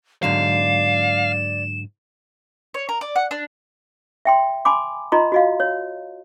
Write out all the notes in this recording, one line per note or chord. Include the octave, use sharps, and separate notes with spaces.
G#2 D3 F#3 D5 F5 E7
C#5
A#4
D5
F#5
D4
E5 G5 C6
G#5 B5 C6 D6
F4 D#5 A#5 C6
F#4 D#5 F5
C#5